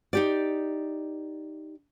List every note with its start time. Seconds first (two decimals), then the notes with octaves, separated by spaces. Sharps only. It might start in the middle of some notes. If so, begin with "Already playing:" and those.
0.13 D#4 G4 D5